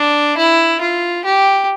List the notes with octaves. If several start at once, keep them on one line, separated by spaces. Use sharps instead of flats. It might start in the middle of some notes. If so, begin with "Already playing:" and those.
Already playing: D4
E4
F4
G4